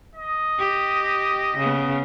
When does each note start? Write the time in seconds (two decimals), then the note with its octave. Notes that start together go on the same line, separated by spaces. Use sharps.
0.15 D#5
0.59 G4
1.57 C#3 B3